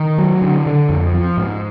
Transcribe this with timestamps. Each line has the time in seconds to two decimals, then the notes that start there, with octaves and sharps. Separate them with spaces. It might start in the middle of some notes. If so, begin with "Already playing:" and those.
Already playing: D#3
0.18 F#3
0.42 D3
0.66 D3
0.89 F2
1.14 F3
1.37 G#2